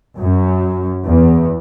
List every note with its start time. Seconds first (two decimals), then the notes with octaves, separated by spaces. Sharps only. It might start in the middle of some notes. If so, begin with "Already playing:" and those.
0.18 F#2
1.06 E2